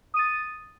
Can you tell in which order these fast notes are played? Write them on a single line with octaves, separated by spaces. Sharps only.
D#6 D#7 A6